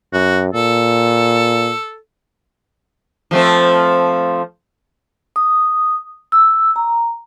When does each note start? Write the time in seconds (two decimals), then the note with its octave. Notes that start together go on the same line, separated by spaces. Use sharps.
0.13 F#2 F#4
0.54 A#2 A4
3.31 F3 A3 C4
5.36 D#6
6.32 E6
6.76 A#5